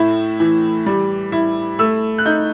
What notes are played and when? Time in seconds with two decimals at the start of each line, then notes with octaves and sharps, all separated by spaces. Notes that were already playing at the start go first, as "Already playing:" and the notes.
Already playing: A2 E4
0.40 E3
0.86 G3
1.32 E4
1.79 A3 E6
2.18 F#6
2.26 D#4 G6